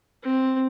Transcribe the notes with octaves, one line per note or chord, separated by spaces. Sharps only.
C4